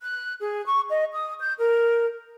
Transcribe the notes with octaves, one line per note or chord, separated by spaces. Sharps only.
F#6
G#4
C#6
D#5
D#6
G6
A#4